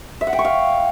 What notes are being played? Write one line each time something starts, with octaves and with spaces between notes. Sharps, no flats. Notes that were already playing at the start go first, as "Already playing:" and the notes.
E5
F#5
G5
C#6
F5